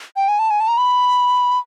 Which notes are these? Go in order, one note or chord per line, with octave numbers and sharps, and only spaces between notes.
G5
G#5
A5
G#5
A5
A#5
B5